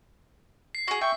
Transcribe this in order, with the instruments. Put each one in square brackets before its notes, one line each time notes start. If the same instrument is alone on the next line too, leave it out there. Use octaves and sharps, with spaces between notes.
[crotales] C7
[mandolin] F#4 G#4
[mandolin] E5 [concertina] G5 C#6